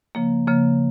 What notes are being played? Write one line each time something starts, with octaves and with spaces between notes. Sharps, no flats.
C#3 F3 A#3
C#3 F3 A#3